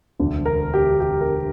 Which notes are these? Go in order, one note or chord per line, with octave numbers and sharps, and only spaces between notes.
E1 D2 D3
A#4
G4
G4
A#4